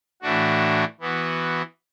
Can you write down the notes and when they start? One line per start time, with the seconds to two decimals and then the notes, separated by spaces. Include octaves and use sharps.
0.22 A2 E3 A3 D4 F#4
1.00 E3 B3 F#4